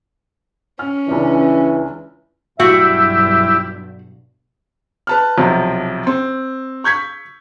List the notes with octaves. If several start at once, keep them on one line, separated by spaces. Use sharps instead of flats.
C#4 F6
C#2 E3 D4
B1 G2 E4 F#4 G4 E5
B4 A5 F6
B1 C3 F3
C4
C#6 G6 G#6 B6